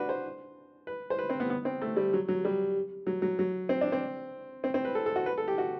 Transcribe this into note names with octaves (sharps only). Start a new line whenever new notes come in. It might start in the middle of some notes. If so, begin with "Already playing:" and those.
Already playing: D4 F#4 B4
C5
B4
C5
B4
C4
B3
B3
C4
A3
G3
F#3
F#3
G3
F#3
F#3
F#3
C4
D4
C4
C4
C4
B4
A4
A4
F#4
B4
A4
G4
F#4